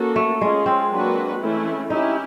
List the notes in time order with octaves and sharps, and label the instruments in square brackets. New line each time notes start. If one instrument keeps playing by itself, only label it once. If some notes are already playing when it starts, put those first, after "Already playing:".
Already playing: [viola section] A#3 C#4 F#4 A4
[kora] A3
[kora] G#3 [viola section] C#4 F4 G#4
[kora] C4
[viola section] F#3 A#3 D4 F#4 B4
E3 A3 C#4 E4
[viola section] C#4 E4 G4 [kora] D#4